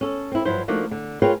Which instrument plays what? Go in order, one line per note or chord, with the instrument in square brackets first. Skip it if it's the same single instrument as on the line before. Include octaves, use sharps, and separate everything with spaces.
[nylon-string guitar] C#4 A4
C4 E4
G2 F3 F#3 E4 C5
F3 A3 A#3 D4 D#4 F#4
D3
F4 G#4 A#4 B4 C#5 G5